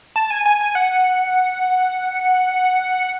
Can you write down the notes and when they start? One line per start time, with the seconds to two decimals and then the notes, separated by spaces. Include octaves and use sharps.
0.16 A5
0.30 G#5
0.46 G#5
0.61 G#5
0.75 F#5